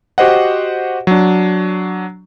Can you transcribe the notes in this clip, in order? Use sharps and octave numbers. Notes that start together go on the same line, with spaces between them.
F#4 G4 C5 D#5 F#5
F#3 D4